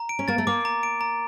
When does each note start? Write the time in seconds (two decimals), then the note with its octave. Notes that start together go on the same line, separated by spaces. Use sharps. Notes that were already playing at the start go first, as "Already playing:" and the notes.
Already playing: A#5
0.09 D7
0.19 C#4
0.28 A#3 A6
0.38 A3
0.47 A#3 D6
0.65 A#5
0.83 D7
1.01 A#5